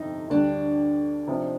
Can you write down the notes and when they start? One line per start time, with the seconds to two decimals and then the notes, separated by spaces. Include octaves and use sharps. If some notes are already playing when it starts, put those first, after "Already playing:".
Already playing: G1 F2 C3 D#4
0.30 D2 D3 G3 D4
1.27 C3 F3 C4 D#4